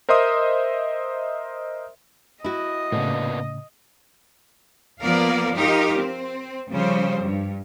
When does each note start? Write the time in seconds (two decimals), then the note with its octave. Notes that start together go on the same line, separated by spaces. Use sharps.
0.09 A#4 C5 D#5 E5 C6 D#6
2.44 E4 F#4 D#5
2.92 A2 C#3 A#3 B3 D4
5.01 F3 A#3 B3 A#4 D5 F5
5.54 D#4 F4 G4 A#4
5.98 C4
6.70 C#3 F3 G3 C5
7.23 G2